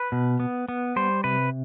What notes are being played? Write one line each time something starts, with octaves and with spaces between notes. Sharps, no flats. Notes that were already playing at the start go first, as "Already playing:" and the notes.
Already playing: B4
B2
B3
B3
G3 C5
C3 B4